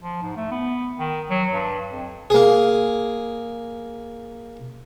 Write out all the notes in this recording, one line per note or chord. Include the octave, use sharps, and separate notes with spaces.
F3
G#2
A3
B3
D#3
F#3
G2
F2
A#3 G#4